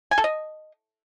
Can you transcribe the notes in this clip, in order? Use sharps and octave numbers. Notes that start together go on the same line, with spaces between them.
G#5
A4
D#5